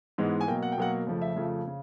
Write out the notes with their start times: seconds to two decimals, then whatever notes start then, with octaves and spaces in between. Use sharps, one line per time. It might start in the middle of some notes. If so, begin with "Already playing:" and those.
0.18 G#2 E3 G#3 B3
0.41 G#5
0.48 B2 F#3 A#3 G5
0.63 F#5
0.72 G5
0.77 B2 F#3 A#3 F#5
1.07 F2 C#3 F3 A3
1.22 E5
1.36 F2 C#3 F3 A3
1.67 C#3